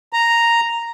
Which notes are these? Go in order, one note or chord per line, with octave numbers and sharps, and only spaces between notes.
A#5